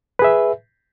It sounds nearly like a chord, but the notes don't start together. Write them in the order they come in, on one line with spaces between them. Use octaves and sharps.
B4 G#4 E5